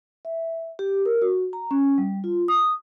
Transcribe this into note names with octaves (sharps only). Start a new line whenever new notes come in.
E5
G4
A#4
F#4
A#5
C#4
G3
F4
D#6